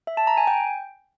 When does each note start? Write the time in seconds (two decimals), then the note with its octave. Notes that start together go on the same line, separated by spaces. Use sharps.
0.07 E5
0.17 A5
0.27 A#5
0.37 G#5
0.47 G5